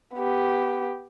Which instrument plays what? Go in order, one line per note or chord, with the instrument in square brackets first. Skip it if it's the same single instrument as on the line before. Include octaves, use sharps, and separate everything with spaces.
[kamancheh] B3 G4